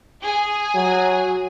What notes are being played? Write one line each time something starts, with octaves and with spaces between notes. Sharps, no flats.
G#4 G#5
F#3